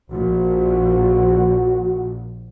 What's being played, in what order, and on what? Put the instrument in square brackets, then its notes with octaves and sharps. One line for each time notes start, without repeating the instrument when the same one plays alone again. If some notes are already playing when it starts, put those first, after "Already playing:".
[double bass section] A#1 [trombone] F#4